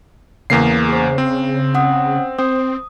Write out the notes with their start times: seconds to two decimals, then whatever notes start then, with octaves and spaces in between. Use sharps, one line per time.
0.50 E2 C#3 A#3 C7
0.89 G#4 C5
1.18 C4
1.74 C#4 F#5 D#6
2.39 C4 C5 D#6